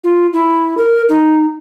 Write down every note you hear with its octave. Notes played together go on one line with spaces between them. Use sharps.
F4
E4
A#4
D#4